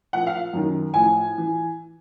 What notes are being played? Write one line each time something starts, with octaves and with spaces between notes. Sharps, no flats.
A#2 F3 F#5
F5
F#2 D#3
A2 F3 G#5
E3